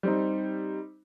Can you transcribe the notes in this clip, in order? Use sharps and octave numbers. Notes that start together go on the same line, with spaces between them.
G3 C4 D#4